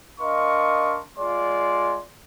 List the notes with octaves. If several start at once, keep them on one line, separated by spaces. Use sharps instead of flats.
D4 A#4 D#5 F5 C6 C#6
G#3 F4 D5 C6